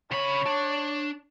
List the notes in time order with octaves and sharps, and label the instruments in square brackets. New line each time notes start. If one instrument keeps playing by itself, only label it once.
[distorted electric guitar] C#3 B5 [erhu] C#5
[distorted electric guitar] D4